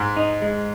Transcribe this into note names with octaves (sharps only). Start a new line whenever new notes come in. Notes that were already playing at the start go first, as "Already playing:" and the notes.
Already playing: G#2
D#4
G#3